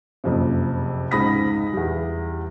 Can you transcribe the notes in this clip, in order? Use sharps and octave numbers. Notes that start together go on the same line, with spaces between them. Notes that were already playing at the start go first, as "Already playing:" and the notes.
F#1 F2 C3
C#2 G#2 B5 D#6 A#6 B6
E2 G3